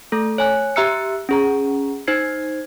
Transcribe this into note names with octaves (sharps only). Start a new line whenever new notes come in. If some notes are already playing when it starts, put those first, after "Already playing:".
A3 A4
C#5 G#5 F#6
G4 E5 A#5 E6 F#6 C#7
C#4 G#4 A#5
D#4 C5 G#6 C7